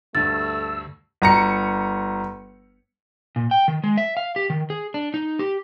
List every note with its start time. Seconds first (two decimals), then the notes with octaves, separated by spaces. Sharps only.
0.15 D2 G2 A3 E6 A6
1.22 G1 A#5 C#7
3.36 A#2
3.51 G5
3.68 D#3
3.84 G#3
3.97 E5
4.17 F5
4.36 G4
4.50 D#3
4.70 G#4
4.94 D4
5.14 D#4
5.39 G4